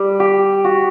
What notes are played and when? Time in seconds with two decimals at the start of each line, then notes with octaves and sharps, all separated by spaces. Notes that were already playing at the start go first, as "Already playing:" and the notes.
Already playing: G3
0.20 G4
0.64 F#4